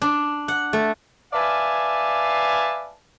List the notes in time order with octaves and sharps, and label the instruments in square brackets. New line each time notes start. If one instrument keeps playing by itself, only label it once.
[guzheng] D4
F#5
A3
[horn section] B4 D5 E5 F5 G#5 A5